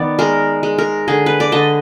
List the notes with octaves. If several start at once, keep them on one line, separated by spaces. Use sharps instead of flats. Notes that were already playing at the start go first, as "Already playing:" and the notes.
Already playing: D#3 B3 D5
G#3 A#4
G#3
A#4
D3 G#4
B4
D5
D3 D#5